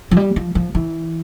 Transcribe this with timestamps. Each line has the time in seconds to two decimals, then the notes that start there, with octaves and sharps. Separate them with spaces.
0.11 F3
0.17 G3
0.36 F3
0.55 F3
0.75 E3